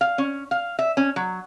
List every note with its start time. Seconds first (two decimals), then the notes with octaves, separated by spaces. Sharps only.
0.01 F5
0.18 C#4
0.51 F5
0.79 E5
0.97 C#4
1.16 F#3